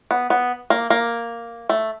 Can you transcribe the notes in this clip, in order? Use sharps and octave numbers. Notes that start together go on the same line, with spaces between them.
B3
B3
A#3
A#3
A3